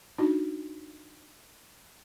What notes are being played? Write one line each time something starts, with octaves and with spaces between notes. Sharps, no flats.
D4 D#4 F#4